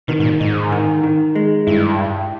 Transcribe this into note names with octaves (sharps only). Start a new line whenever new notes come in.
B2 D#3
G#2
A#2
G#2 D#4
D#3
D#3
G#3
G2 E4